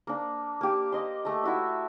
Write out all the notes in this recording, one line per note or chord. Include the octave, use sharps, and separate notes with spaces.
A#3 D4
A#3 G4
D#5 C6
A3 A#5
E4 F#4 E5